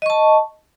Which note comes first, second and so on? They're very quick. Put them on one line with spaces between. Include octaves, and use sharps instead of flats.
D#5 C#6 A5